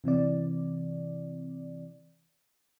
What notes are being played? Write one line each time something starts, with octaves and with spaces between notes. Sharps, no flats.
C3 E3 C4 D5